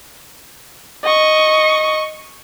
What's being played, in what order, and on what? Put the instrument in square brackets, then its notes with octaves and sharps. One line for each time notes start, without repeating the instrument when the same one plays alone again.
[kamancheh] D#5 C#6